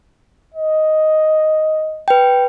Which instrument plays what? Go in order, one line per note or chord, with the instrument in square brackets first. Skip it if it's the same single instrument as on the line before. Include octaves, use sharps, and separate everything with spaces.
[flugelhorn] D#5
[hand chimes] B4 G5